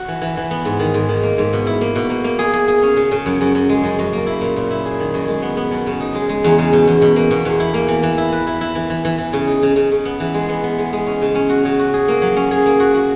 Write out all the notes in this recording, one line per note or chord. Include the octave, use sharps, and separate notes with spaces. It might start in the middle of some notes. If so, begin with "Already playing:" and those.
Already playing: F#4
E3
E3
E3
B3
G#2
D#3
G#2
D#3
A#3
G#2
B2
E4
A#3
B2
A#3
A#3
G#4
G#4
G#4
C#4
C#3
C#3
F#2
F#2
F#2
G#3
F#2
F#2
A#3
E4
A#2
A#2
E4
G#4
D#3
F#2
G#3
B3
B3
F#2
C#3
D#4
G#3
G#3
E2
C#3
B2
E2
B2
A#3
B2
E2
E4
A#3
E3
E3
E4
B4
E4
E4
E3
E3
E3
E3
C#3
D#4
C#3
C#3
C#3
B3
E3
G#3
B3
B3
G#3
G#3
C#4
C#3
C#4
F#4
C#3
F#4
G#4
A#3
F#3
C#4
G#4
A#3
F#4
F#4